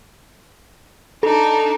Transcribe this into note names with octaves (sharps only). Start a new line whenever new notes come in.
D4 D#4 A4